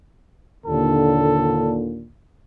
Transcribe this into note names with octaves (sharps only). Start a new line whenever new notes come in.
D#2 A#2 D3 A4